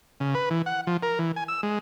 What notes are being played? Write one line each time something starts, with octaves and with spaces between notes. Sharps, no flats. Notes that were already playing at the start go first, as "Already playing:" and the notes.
C#3
B4
E3
F#5
F3
A#4
E3
G#5
E6
G#3